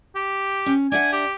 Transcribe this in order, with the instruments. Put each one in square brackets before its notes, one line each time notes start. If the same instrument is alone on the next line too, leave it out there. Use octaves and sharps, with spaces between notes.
[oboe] G4
[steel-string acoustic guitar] C#4
[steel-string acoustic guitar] D4 E5 F#5 [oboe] G#5
[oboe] G4